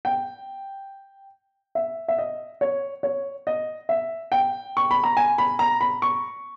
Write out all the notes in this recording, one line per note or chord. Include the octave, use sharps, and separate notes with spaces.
G5
E5
E5
D#5
C#5
C#5
D#5
E5
G5
C#6
B5
A#5
G#5
B5
A#5
B5
C#6